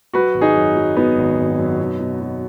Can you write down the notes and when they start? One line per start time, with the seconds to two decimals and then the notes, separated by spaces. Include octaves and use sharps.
0.13 F#3 F#4 B4
0.34 G#1
0.41 D#4 G#4
0.56 F#2
0.76 F#3
0.96 F#3 B3 D#4
1.17 G#1
1.37 G#1
1.59 F#2
1.79 B2
2.00 B2
2.21 F#3